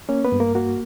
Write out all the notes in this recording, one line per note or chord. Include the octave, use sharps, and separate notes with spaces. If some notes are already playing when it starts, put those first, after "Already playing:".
A#3 C#4 C#5
B3 B4
G2
A#3 A#4
A#3 F#4